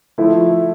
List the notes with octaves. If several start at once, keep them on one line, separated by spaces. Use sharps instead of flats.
F3 A3 E4